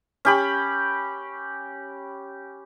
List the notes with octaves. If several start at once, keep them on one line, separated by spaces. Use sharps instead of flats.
C#4 G4 B5